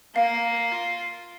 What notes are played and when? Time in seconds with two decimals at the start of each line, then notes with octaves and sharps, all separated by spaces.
0.15 A#3 F5
0.72 F4